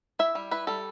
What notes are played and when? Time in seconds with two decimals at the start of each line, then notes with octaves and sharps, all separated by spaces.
0.19 E4 E5
0.35 G3
0.51 E4 B4
0.67 G3 A4